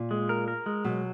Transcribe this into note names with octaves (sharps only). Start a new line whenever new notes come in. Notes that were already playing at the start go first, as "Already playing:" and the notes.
Already playing: A#2
G#3
A#4
A#4
G#3
B2 F#3